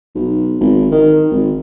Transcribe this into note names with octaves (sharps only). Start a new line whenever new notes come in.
B1
G#1
D#3
G#1